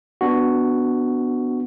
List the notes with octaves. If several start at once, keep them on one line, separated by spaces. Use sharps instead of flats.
B3 D4 F#4